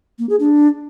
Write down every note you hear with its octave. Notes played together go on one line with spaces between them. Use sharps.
A#3
G#4
D4